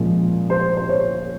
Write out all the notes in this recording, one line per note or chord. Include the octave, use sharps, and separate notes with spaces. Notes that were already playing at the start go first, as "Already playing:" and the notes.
Already playing: A#2 F3 G#3 C#4
C5
C5
C#5